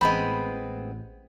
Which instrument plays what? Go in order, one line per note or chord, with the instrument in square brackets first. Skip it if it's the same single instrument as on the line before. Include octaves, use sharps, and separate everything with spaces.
[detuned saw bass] A1 [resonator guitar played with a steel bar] G#3 B3 C4 [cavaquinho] B5